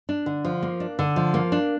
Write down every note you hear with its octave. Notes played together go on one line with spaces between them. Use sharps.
D4
D3
F3
A#3
D4
D3
F3
A#3
D4